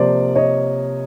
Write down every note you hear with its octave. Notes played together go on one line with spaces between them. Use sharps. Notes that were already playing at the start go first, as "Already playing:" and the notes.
Already playing: C3 F3 A#3 C5 D5
C#5 D#5